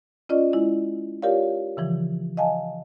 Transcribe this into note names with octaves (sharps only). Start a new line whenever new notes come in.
C#4 F4 D5 D#5
G#3 E4
F4 G4 A#4 C#5 D5 F5
C#3 E3 F3
D#5 F5 G#5 A5